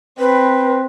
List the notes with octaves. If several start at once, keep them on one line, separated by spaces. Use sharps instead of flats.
C4 B4